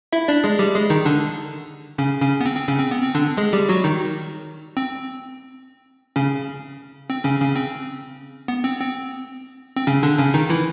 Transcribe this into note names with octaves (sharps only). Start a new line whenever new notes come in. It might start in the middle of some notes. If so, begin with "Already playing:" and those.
E4 E5
D4 D5
G#3 G#4
G3 G4
G#3 G#4
D#3 D#4
D3 D4
C#3 C#4
C#3 C#4
B3
C4
C4
C#3 C#4
C4
B3
C4
D3 D4
G#3 G#4
G3 G4
F#3 F#4
D#3 D#4
C4
C#3 C#4
C4
C#3 C#4
C#3 C#4
C4
B3
C4
C4
C4
C#3 C#4
D3 D4
C#3 C#4
D#3 D#4
E3 E4